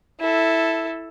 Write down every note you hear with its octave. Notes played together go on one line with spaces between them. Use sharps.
E4 A4